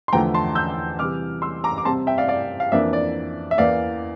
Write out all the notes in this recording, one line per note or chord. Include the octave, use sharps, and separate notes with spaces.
C6
E2 D3 F3 A3 G5 A#5
A5 C6
E6 G6
C3 E3 G3 D6 F6
C6 E6
A#5 D6
D6
C3 G3 C4 A5 C6
E5 G5
D5 F5
D5 F5
F5
F2 E3 A#3 D4 E5
D5
E5
E2 E3 A#3 D5 F5